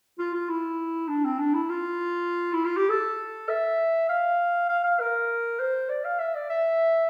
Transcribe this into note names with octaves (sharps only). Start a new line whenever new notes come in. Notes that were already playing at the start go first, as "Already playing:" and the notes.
F4
F4
E4
D4
C4
D4
E4
F4
E4
F4
G4
A4
E5
F5
F5
F5
A#4
C5
D5
F5
E5
D5
E5